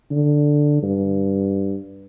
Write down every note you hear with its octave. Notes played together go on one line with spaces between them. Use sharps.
D3
G2